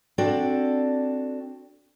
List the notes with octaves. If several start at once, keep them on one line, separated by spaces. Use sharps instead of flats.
C4 D4 F#4 A4 D5